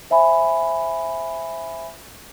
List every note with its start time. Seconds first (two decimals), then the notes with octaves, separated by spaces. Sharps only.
0.10 C5 E5 G#5 B5